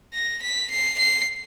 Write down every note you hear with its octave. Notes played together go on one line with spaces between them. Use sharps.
A#6
B6
C7
C7